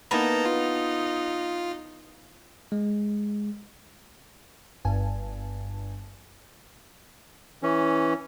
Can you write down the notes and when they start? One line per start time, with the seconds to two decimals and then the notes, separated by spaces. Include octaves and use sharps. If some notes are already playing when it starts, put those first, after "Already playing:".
0.11 A#3 B3 D#4 E4 A5 A#5
0.45 F4
2.72 G#3
4.85 G1 G2 G#5 A5
7.63 E3 C#4